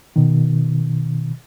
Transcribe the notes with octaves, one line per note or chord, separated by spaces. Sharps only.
B2 D#3